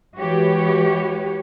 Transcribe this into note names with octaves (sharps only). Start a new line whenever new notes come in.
E3 G#3 F#4 G4 B4 C#5